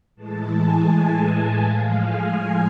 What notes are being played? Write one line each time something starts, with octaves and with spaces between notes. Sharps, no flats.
A2 E3 G#3 A5
G#5
A2 F3 G#3 F5
G#5